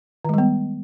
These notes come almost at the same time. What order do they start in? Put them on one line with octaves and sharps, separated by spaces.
D#3 G#3 G3 B3